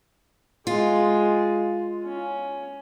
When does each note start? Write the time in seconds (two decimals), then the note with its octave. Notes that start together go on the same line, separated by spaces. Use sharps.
0.67 G#3 F4
2.04 C#4